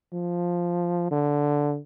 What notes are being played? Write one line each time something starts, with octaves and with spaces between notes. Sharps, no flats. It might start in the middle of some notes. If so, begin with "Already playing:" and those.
F3
D3